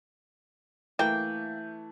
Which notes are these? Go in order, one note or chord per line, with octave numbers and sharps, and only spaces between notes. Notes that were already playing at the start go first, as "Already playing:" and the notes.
E3 A3 A#3 G5 G6